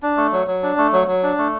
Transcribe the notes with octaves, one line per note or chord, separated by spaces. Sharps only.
D4
A3
F#3
F#3
D4
A3
F#3
F#3
D4
A3